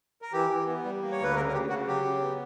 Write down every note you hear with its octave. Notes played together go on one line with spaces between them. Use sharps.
A#4
E3 G4
E3
B3
G3
A#3
C#5
D2 B4
C#3 A#4
A#4
C#3 G4
C#3 F#4
F#3 G4
C#3
B3